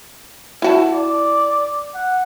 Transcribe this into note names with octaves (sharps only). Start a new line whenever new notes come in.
E4 F#4 A5
D5
F#5